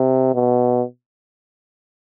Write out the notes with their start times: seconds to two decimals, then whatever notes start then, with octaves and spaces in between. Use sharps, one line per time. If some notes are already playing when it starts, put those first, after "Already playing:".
Already playing: C3
0.35 B2